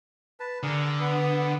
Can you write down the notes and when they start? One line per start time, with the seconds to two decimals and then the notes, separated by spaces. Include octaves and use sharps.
0.40 B4 A5
0.63 D3 G#4 A#4
1.00 B3 B4 D#6